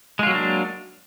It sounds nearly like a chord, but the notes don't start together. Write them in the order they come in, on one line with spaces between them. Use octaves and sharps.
G#3 F4 F#3 A#3 D4